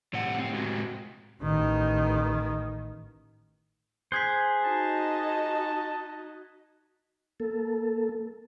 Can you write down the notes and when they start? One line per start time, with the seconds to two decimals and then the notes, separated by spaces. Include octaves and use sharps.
0.14 B1 A2 C3 F#5
0.39 C4
0.54 G#3 F#4
1.43 A1 D#3
4.12 G#4 C5 F#6 G#6 B6
4.64 D#4 F#4 D#5 A5
7.40 A#3 A4